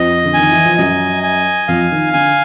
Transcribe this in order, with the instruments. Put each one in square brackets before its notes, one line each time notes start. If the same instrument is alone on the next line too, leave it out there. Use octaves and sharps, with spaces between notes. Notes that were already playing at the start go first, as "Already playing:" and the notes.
Already playing: [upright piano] F2 F3 [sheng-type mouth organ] D#5
[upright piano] D3
[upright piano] D#3 [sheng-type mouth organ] G#5
[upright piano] E3
F3
[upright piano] F#2 F#3 [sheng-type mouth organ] D#5
[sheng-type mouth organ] G#5
[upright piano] F2 F3 [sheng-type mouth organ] F5
[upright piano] D#3
[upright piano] D3 [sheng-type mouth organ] G#5